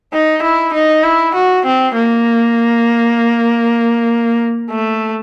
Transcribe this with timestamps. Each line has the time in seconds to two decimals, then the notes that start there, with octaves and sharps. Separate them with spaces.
0.13 D#4
0.43 E4
0.74 D#4
1.04 E4
1.35 F#4
1.65 C4
1.95 A#3
4.70 A3